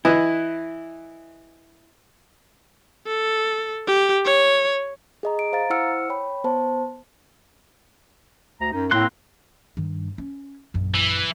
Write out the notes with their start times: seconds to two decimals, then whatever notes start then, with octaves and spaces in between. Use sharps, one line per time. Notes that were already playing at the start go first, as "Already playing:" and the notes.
0.05 E3 E4 B4 D#5
3.07 A4
3.87 G4
4.25 C#5
5.23 G#4 D#5 A#5
5.39 D7
5.52 C5 F5 A#5 A6
5.70 E4 C5 F#5 E6 F6 C#7
6.09 C#5 G5 B5
6.44 B3 C5 A5
8.60 D2 A#5
8.72 F#2 D#4
8.91 A2 A#3 C4 C6 F#6
9.77 G2 D#3
10.18 C#4
10.74 A#1 F#2
10.94 E3